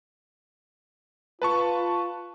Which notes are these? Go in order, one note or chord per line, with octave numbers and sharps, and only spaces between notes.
F4 B4 A5 C#6